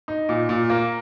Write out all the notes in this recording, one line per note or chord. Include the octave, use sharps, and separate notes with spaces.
D#4
A#2
A#2
A#3